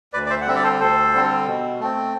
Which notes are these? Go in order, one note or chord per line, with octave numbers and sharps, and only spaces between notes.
D2 B4 D5
D5
C5 E5
F#5
D3 G3 C4 E5
D5
A4 C5
D2 A4 C5
D3 G3 C4
B2
A3 C4